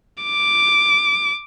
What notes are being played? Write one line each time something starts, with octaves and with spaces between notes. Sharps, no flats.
D6